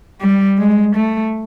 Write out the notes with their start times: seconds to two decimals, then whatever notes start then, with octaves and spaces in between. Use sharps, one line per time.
0.21 G3
0.58 G#3
0.95 A3